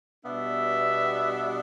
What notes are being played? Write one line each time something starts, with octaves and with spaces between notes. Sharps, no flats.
B2 G3 B3 D4 E5